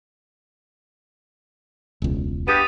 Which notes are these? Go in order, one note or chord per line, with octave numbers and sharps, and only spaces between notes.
E1 C#2
G2 B3 G4 D#6 A6 D#7